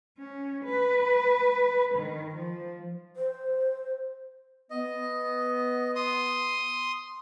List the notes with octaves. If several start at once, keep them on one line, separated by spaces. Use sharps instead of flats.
C#4
B4
D#3
F3
C5
B3 D#5
C6 D#6